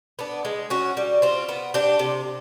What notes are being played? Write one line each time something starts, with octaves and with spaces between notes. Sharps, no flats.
B3 D4
G#3
C#4 F#4
G3
C4 F4
B3
D4 G4
C3